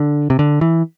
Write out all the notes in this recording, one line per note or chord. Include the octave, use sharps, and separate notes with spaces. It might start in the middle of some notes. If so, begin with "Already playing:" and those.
Already playing: D3
C3
D3
E3